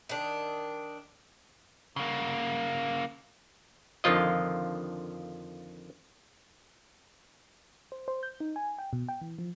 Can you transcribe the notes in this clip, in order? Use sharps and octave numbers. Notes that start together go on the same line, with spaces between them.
D#3 D4
C#3 A#3
F2 D3 D#3 F3 F4 D#5
C5
C5
G6
D#4
G#5
G5
B2
G5
E3
F3